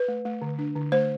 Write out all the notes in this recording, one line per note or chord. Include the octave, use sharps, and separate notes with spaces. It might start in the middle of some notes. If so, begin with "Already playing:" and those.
Already playing: B4
A3
A3
D3
D4
D3
A3 C5